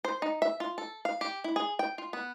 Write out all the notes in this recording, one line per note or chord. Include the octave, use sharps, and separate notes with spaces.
C5
D#4
E5
F4
A4
F5
G4
E4
G#4
G5
F4
B3